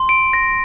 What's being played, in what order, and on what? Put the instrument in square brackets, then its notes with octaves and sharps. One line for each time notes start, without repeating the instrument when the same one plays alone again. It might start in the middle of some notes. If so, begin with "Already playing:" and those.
Already playing: [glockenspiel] C6
D7
A#6